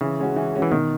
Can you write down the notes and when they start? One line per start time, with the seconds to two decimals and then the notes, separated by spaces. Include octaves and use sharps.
0.01 C#3 E3
0.19 G#3 C#4 F#4
0.36 E3
0.54 G#3 C#4 F#4
0.62 E3
0.72 B2 D#3